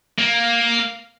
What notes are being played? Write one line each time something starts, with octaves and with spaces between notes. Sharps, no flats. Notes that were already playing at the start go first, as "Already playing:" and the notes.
A#3